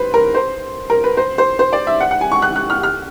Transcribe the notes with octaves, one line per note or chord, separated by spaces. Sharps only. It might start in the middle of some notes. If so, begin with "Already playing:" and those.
Already playing: B4 C5
A#4
C5
A#4
B4
C5
C5
C5
D5
E5
F#5
F#5
G#5
C#6
F#6
F#6
F6
F6